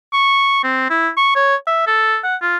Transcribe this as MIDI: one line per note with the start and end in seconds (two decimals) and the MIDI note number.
0.13 0.62 85
0.64 0.88 60
0.90 1.09 64
1.17 1.31 85
1.36 1.56 73
1.67 1.83 76
1.87 2.18 69
2.24 2.36 78
2.42 2.57 65